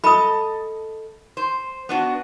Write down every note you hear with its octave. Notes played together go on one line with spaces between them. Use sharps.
A4 D#5 B5 D#6
C5
B3 D4 F#4